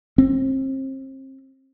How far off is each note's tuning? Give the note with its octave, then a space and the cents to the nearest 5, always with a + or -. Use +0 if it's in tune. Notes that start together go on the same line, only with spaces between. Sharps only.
C4 +30